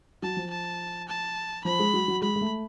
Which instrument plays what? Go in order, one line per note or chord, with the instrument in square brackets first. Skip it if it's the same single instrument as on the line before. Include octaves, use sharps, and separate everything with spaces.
[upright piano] F#3 [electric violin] A5
[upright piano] F3
[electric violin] A5
A5
[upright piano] F3 [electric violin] B5
[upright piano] G#3
F#3
F#3
[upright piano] G#3 [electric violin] B5
[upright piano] G#3
A3